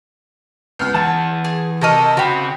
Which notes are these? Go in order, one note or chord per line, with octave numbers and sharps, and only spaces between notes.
C#2 B3 F6
E3 F#5 A5
G#4
C3 F#4 A4 A#4 D#5 D#7
C#3 C4 F#4 G4 B5